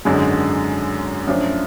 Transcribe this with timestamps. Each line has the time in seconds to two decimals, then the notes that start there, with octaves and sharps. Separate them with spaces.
0.05 G#1 F#2 D3 G#3 D4
1.27 F#2 F3 A3 D4